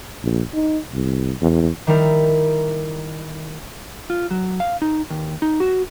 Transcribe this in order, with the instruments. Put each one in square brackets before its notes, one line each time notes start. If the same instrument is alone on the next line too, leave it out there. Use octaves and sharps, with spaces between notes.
[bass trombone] A#1
D#4
C2
E2
[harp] D#3 G3 E4 A#4
[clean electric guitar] F4
F#3
F5
D#4
D#2
D#4
F#4